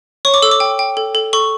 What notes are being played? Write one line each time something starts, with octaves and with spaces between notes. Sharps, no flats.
C#5 C#6
D6
A4 E6
D6
G5
G5
A4
A4
A4 C#6